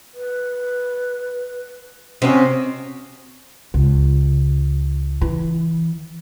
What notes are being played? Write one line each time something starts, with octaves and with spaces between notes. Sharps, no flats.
B4
C3 C4 C#4 F#4 D#5
C#2
E3